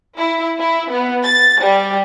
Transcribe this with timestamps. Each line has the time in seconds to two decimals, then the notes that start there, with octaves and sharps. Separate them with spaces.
0.18 E4
0.58 E4
0.90 B3
1.22 A6
1.60 G3